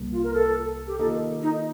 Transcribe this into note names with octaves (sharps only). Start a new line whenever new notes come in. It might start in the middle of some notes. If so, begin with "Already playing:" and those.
Already playing: C2 C3 G3 A#3
F4
A#4
A4
G4
D#3 A#3 F4 A4 A#4 D#5
D#4